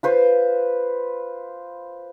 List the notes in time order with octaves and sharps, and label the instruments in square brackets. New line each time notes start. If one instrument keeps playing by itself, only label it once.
[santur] F4 B4 C5